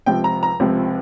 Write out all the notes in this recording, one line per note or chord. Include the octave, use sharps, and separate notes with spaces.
C#2 C3 F3 C4 G5
A#5
A#5
C#2 C3 F3 C4